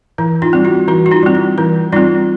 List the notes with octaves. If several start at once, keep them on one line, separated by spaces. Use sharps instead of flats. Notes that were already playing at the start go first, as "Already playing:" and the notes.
E3 E4
D#4 F4
G3 C4
E4 F#4
E3 E4 F#4
F#4
D#4 F4
G3 C4
E4
E3 E4
G3 C4 D#4 F4